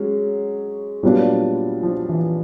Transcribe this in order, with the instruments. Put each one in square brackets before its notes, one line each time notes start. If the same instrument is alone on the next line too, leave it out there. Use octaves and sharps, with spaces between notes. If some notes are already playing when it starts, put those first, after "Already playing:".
Already playing: [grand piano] F#3 [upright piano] G#3 C#4
[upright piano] A#2 F#3 B3 D4 F4 [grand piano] G3
[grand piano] F3
E3